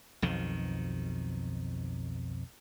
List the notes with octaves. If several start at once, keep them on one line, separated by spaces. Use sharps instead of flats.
B1 F2 D#3